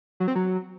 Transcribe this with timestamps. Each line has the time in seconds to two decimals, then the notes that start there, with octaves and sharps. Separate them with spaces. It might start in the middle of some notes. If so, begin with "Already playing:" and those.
0.20 F#3
0.28 C4
0.35 F#3